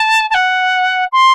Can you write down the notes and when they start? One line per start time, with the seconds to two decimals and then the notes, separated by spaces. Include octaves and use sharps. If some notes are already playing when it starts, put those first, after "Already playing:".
Already playing: A5
0.30 A5
0.34 F#5
1.12 C6